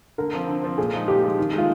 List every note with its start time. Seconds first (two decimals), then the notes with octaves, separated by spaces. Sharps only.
0.18 D3 A#4
0.34 F3 C4
0.48 D3
0.64 F3 C4
0.78 A#2 G#4
0.93 F3 G#3 D#4
1.08 A#2 G4
1.23 F3 G#3 D#4
1.38 D#3
1.53 G#3 D#4
1.58 F4